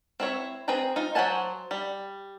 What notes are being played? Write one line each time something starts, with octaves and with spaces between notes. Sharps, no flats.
C4 E4 C#5 E5
C4 G#4 B4 G5 A#5
D#4 F4
F#3 C5 F#5 G#5 A5
G3